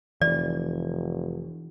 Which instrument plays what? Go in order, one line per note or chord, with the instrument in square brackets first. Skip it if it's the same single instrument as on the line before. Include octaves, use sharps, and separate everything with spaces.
[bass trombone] F1 [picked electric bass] E3 [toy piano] D5